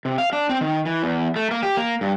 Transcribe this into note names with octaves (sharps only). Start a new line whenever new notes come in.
C3
F5
D4
C4
D#3
E3
E2
A3
A#3
G4
A#3
G2